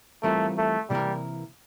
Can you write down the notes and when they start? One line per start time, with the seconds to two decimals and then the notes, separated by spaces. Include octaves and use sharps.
0.23 E3 G3 A3 C4 F4 A#4
0.57 A3
0.90 C3 E3 G3 A#3 E4 A#4